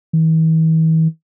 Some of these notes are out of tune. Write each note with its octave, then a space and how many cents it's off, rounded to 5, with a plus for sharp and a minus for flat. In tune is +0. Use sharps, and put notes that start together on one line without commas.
E3 -45